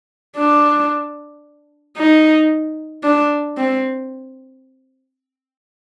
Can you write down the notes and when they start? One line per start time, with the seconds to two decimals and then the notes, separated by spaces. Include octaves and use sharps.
0.36 D4
1.97 D#4
3.04 D4
3.57 C4